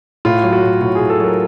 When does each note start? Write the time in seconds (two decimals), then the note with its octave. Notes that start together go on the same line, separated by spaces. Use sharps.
0.25 A2 F4
0.43 F#3
0.53 F#4
0.62 A2
0.81 A2 F#4
0.95 G#4
0.99 A2
1.10 A4
1.19 F#3 A#4